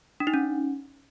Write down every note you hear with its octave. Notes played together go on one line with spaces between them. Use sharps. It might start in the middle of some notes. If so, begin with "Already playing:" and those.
D4
D#4
C#4